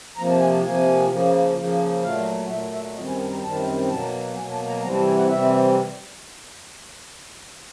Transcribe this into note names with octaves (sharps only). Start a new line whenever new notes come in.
C3 F3 A#3 A#5
A5
G#5
A5
C3 F3 A#3 G#5
C#3 F3 A#3
C#3 F3 A#3
A#2 F#3 A3 F5
A#2 F#3 A3 E5
E5
F#2 D#3 G3 C4 D#5
G#5
A5
A#5
F#2 D#3 G3 C4 A5
B2 F#3 A#3 A5
B2 F#3 A#3 G#5
A5
A#5
C3 E3 G3 C4 A#5
A5
G#5
F#5
C3 E3 G3 C4 E5